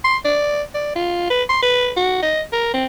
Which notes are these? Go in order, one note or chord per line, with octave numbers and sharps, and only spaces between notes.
C6
D5
D5
F4
B4
C6
B4
F#4
D#5
A#4
C4